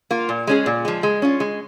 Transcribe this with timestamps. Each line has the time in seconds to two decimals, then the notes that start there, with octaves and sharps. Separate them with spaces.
0.11 A#3 F4
0.29 A#2
0.47 G#3 C#4 G#4
0.66 A#2
0.85 F3 G#3
1.03 G#3
1.22 C#4 F4
1.40 G#3